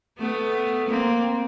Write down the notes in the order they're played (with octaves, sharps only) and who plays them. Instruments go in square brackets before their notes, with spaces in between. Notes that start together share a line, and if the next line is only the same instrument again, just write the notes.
[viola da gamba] A3 B3
A#3 C4